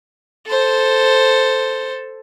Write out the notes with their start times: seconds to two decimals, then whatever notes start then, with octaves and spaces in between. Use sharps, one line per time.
0.47 A4 C5